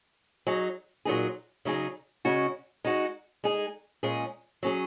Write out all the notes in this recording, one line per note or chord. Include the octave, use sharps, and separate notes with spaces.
F#3 D#4 G#4
A#2 F#3 D#4 G#4
C#3 F#3 D#4 G#4
C#3 G#3 C#4 F#4
G#3 D#4 F#4
G#3 D#4 G#4
A#2 G#3 C#4 G#4
F#3 C#4 G#4